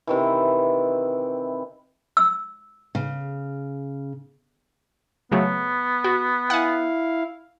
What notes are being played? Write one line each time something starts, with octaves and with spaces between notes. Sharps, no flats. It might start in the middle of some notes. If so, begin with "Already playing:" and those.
C3 D#3 E3
E6
C#3
C#3 F#3 A3 B3
F#4
E4 F5 F#5 G#5